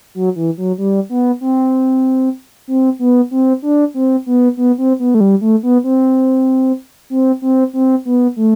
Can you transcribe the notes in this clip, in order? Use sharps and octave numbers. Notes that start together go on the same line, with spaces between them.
F#3
E3
F#3
G3
B3
C4
C4
B3
C4
D4
C4
B3
B3
C4
B3
A3
G3
A3
B3
C4
C4
C4
C4
B3
A3